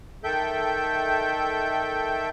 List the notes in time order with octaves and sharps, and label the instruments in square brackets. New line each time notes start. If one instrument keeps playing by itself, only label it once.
[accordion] D#3 A4 E5 G5 G6